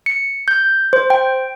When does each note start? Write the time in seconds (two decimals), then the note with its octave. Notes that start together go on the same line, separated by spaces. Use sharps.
0.06 C#7
0.48 G6
0.93 C5
1.10 G5